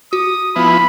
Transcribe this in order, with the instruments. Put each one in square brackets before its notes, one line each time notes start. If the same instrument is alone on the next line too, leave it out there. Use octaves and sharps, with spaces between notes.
[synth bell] F#4 [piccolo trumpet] D#6
[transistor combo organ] F3 B3 E4 [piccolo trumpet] B5